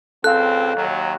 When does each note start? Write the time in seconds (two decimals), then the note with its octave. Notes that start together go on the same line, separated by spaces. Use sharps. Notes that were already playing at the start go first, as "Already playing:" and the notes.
0.24 C#2 C4 A4 F5 F#6
0.76 D#2 F#3